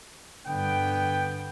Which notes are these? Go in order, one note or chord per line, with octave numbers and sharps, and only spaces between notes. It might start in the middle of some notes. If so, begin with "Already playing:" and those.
G2 D3 B3 G5